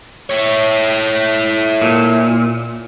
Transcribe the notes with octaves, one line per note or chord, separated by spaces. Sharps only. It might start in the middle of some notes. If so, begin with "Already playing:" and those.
E4 C#5
A#2